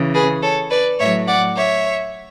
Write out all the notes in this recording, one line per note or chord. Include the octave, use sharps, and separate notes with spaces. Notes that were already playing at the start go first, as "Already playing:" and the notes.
Already playing: C#3 E3
G#4 B4
A4 C#5
B4 D5
A2 F#3 C#5 E5
D5 F#5
C#5 E5